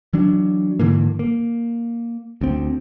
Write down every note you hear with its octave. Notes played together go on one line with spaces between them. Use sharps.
E3 F#3 D4
G#2 D3 E3 A#3
A#3
D2 C4